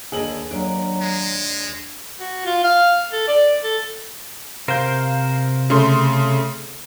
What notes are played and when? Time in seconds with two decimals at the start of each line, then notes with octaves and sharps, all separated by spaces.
0.12 D#2 D3 G#4 D#5 F#7
0.51 D#2 F#3 D4
1.01 G#3
2.20 F#4
2.46 F4
2.64 F5
3.12 A4
3.27 D5
3.63 A4
4.68 C3 A#4 C5 F5 G6
5.70 C#3 A3 C6